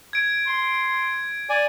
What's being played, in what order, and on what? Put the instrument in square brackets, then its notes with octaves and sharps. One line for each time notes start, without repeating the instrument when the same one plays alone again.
[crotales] G#6 D7
[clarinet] C6
[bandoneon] D5 G#5